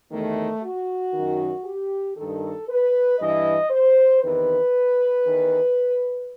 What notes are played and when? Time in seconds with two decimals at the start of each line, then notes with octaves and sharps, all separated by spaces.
0.11 E2 C3 D#3 A3
0.62 F#4
1.14 F#2 D#3
1.64 G4
2.16 G2 D#3 A4
2.68 B4
3.18 G2 E3 D#5
3.70 C5
4.21 E2 C3 D#3 B4
5.24 E2 D#3